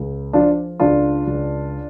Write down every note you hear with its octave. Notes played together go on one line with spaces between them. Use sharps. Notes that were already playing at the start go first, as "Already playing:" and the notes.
Already playing: C#2
F3 D4 F4
C#2 D4 F4
C#2